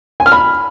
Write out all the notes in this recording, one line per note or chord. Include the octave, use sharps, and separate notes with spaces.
G#5
F6
B5